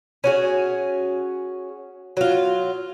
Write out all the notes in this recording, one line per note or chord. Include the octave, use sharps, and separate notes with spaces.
C#4 F#4 G#4
F#3 F4